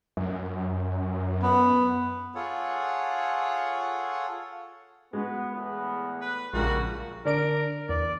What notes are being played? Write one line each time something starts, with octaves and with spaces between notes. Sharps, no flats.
F#2
B3
F4 G#4 A4 C#5 F#5
G#3 B3 F#4
E2 A2 B3
B4
A#1 C#3 F3 G3 G#3 F#4 A#4
D3 D4 A#4 D7
E2 D5